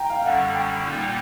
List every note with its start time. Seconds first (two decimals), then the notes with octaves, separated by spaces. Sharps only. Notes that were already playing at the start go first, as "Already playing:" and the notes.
Already playing: G5 A#5
0.10 F5
0.24 F#2 D3 G3 F#5
0.54 G5
0.84 A#2 G3 A#3 D#4